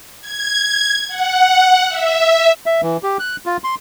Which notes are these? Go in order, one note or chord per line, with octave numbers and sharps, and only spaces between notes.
G#6
F#5
E5
E5
E3
G4
F#6
F4
C6